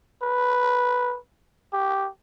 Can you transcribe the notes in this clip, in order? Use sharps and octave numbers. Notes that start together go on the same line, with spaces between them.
B4
G4